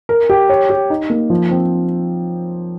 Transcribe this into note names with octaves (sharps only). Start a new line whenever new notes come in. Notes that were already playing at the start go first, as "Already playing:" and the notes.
A#4
G4
C#5
G4
D#4
A#3
F3
C4